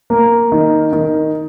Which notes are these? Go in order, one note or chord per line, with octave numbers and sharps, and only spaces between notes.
A#3
D#3
D#3